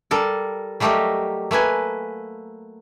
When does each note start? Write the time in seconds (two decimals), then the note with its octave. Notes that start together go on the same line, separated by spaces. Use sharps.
0.11 G3 A4 A#4
0.80 F#3 G3 A3 G4 A#4 D#5
1.51 A3 A#3 B4 G#5